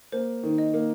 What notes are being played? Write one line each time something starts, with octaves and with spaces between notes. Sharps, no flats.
A#3 C5
D#3
D#5
A#3